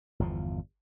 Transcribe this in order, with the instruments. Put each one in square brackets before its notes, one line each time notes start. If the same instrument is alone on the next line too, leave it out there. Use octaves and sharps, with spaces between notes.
[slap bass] G1 E2 C3 F3